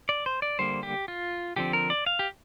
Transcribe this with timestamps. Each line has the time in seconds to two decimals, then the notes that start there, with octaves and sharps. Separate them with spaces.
0.09 D5
0.26 C5
0.42 D5
0.59 D3 G3 A#3 C5
0.83 G4
1.08 F4
1.56 D3 F3 C4 G4
1.73 A#4
1.90 D5
2.07 F5
2.19 G4